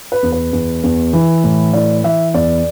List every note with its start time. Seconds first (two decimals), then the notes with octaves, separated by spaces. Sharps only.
0.12 B4
0.23 E2
0.32 B4
0.53 E2
0.84 E2
1.13 E3
1.44 A2
1.73 E3 D5
2.04 E3 E5
2.34 E2 D5